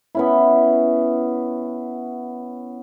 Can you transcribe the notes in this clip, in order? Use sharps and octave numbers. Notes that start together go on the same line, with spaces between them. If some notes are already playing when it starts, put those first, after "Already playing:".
B3 C#4 E4